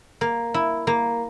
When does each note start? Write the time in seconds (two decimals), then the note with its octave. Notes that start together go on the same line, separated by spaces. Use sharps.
0.21 A#3
0.54 E4
0.87 A#3